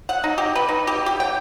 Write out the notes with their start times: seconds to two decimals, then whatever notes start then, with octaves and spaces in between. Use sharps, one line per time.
0.09 F#5
0.24 D#4
0.38 G4
0.55 B4
0.69 D#4
0.87 G4
1.06 G4
1.20 G5